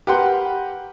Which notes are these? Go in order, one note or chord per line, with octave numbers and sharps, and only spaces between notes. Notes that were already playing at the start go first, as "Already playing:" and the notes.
G4 A#4 B4 F#5 C6 G6